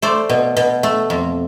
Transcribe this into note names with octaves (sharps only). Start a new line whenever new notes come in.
A3 C5 D5
B2
B2
A3
F2